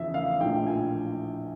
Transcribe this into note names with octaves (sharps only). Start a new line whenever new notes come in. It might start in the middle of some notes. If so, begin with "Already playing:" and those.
Already playing: E2 C#3 F3 E5
F5
A#1 A2 F3 G5
G#5